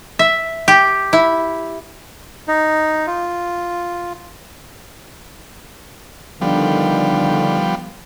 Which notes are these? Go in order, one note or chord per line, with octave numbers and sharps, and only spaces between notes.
E5
G4
E4
D#4
F4
D3 D#3 F3 G3 B3